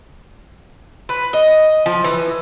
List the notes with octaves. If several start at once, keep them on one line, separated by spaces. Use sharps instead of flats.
B4
D#5
F3
E3